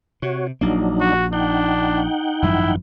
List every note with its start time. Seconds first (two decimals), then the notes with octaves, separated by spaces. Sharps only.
0.22 C3 F#4 C#5
0.61 A#1 F#3 A#3 D4 D#4
1.01 F#4
1.33 D4 D#4 F#5 G5
2.42 G#1 F#2 F3 E4